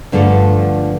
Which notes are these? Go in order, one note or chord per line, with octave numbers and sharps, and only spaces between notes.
G2 D3 F3 A3 A4 F#5